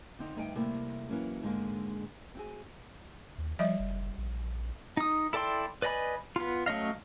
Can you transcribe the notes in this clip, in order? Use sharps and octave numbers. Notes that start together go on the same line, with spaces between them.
D3 C4 D#4
D2 G2 D#4 F5 G5
C3 G3 A3 A#3 E4
E3 F#3 A#3 C#4
G#2 D3 G#3 A#3
C4 F#4 G#4
D#2
F3 G3 D#5 E5
F#1
A#1
D#4 D#6
E4 A4 D5 G5 C6
B4 D5 D#5 G#5 B5
B3 F4
F#3 A3 C#4 D#5 F5